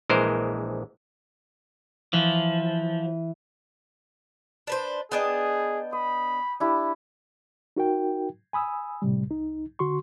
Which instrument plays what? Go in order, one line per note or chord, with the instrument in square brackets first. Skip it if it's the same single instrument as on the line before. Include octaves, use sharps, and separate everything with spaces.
[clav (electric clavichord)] A#1 E3 G#3 A#4 C5
[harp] E3 [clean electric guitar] F3
[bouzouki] D4 B4 C5
[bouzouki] B3 D4 D#5 [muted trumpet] G#4 [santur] G5
[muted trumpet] B5 [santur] D#6
[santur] D4 E4 G4
[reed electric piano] D#4 F#4 A#4 G5
G#5 B5 D#6 E6
A2 C3 G3
C2 D#4
D3 F#4 C6 C#6